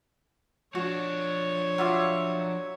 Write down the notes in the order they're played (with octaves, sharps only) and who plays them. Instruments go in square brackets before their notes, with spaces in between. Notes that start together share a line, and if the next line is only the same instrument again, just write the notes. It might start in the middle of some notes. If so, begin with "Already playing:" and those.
[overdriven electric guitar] F3 D4 [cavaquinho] F#4 [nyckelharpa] C#5
[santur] F#3 E5 D6 [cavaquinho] F4 F#4 F5